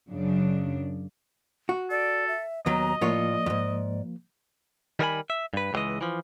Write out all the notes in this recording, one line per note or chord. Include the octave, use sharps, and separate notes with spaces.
F#2 C#3 D4
F#4
A4 D5
E5
D#2 B2 F#3 D#5 A#5
A2 F3 A#3 F4 C#5 D5
E2 G#2
D#3 G3 A#4 D#5 G#5 B5
E5
G2 B4
C#2 A2 E3 G#3 D#5
E3 F3